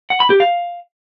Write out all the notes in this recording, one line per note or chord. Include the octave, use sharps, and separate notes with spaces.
F#5
B5
G4
F5